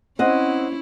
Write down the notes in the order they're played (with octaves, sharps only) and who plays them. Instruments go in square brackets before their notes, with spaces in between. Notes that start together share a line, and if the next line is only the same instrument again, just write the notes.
[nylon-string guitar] C4 D#5 F#5 [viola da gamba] C#4 E4